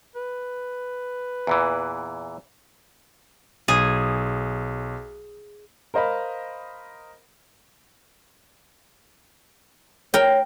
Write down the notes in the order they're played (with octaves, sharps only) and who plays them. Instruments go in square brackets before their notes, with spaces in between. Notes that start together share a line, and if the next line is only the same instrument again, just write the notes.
[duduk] B4
[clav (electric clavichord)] E2 A#2 E3
[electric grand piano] B1 [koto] G#4
[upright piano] A#4 C5 D#5 F5 B5
[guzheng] A#4 G5 [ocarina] C#5